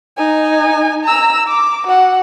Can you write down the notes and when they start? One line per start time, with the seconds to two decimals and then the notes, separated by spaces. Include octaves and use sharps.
0.18 D#4 G#5
1.04 A#5 E6
1.48 D6
1.87 F#4 F#5